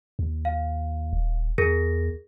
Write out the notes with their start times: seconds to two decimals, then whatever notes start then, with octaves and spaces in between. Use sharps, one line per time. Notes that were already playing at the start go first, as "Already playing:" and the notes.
0.19 D#2
0.45 F5
1.13 D#1
1.58 E2 G#4 A#4 A#6